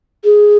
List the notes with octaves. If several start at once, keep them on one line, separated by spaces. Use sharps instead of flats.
G#4